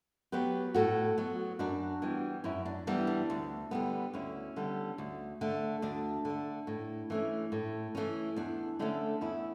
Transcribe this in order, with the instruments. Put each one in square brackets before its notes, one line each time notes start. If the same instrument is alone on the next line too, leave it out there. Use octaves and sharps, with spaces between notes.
[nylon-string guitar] F#3 B3 G4 B4
A2 F#4 A4
F#3 B3
F#2 D4 F#4
E3 G3 B3
F#2 C#4 E4
D4
E3 G3 B3 D4
D4
D2
D3 G3 B3
D2 C#4 E4
D3 G3 B3
D2
D3 A3
D2 D4
D3 A3
A2
E3 A3 C#4
A2
E3 A3 C#4
E2 D4
D3 A3 C#4 D4
E2 C#4 E4